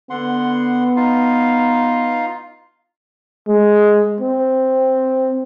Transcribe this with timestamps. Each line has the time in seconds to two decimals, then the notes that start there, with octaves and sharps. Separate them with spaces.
0.10 D3 B3 F#5 C6
0.96 D#4 F4 F5
3.47 G#3
4.21 C4